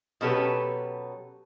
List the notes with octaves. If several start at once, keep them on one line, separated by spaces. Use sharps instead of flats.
B2 F#3 C#4 G4 A4 B4